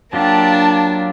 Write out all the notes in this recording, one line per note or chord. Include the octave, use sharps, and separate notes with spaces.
F#3 A#3 D4 F4 G4 A5